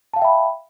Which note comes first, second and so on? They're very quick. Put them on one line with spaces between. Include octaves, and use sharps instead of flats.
A5 F5 G5 E5 B5